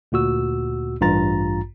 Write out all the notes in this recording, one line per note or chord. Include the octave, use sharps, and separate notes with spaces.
D2 A#2 F#4 E6
A1 G2 F4 A#5 A6